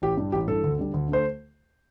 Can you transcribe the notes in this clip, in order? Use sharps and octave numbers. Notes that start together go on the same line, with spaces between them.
A1 G4
G2 G3
A1 G4
G2 E3 A4
D2
D3 G3
D2
D3 A3 C5